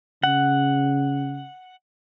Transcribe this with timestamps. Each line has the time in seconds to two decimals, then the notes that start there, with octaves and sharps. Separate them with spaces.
0.23 C#3 F#5